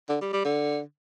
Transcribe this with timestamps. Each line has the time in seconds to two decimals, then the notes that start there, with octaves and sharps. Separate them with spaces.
0.09 D3
0.21 G3
0.33 G3
0.45 D3